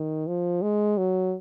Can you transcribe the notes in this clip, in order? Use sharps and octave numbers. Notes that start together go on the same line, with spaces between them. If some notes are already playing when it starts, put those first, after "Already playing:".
Already playing: D#3
F3
G#3
F#3